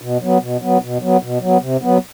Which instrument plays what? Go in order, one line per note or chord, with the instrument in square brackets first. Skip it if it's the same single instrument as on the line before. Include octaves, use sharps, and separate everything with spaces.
[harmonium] B2
F#3 B3
B2
F#3 B3
B2
F#3 B3
B2
F#3 B3
C3
F#3 B3